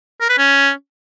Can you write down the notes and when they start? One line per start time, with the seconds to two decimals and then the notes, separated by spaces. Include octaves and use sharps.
0.21 A#4
0.29 B4
0.38 C#4